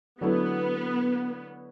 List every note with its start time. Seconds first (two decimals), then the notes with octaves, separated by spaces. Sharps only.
0.21 D3 F#3 A3 B3 E4 B4